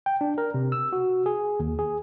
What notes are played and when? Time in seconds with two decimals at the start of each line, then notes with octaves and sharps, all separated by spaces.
0.06 G5
0.21 D4
0.38 A#4
0.54 C3
0.72 E6
0.93 F#4
1.26 G#4
1.60 D#2
1.79 G#4